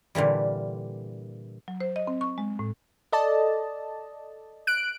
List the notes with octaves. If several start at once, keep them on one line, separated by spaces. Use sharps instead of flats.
A#2 D3 E3 G3
F#3
C5
D#5
C4
C#6
G#3
A2
A4 D5 D#5 A5
F#6 D7